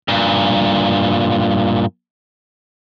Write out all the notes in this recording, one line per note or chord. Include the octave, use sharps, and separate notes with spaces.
G2 A#2